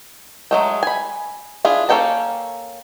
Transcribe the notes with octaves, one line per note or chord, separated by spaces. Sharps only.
F#3 G#3 A3
G#5 B5
D4 E4 F4 G#4
A#3 C#4 A4 G5 A5